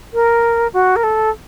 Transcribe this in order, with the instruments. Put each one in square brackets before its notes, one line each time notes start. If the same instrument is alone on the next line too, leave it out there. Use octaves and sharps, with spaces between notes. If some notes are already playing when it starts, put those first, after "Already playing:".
[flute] A#4
F#4
A#4
A4